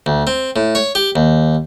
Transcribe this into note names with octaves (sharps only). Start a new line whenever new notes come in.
D2
C4
A2
C#5
G4
D#2